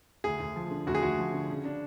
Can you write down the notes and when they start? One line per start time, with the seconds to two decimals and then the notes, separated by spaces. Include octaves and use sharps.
0.24 D2 G#4
0.40 D2
0.56 F3
0.71 D3
0.87 D2 F#4
0.95 G#4
1.03 D2 F#4
1.18 F3
1.33 D3
1.50 C#3
1.65 D4